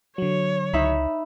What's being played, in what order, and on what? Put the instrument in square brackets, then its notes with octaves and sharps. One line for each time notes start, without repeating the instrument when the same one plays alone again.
[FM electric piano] D3 F#3 [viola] C#5
[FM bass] C#2 [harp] D#4 E5 B5